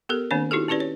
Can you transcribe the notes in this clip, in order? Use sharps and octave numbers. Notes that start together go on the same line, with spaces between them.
B3 G4 A4 A#4
D#3 A#3 C4 D4 C#5
D#4 E4 F#4 G4 A4
C#4 E4 G4 B4 D5
C#5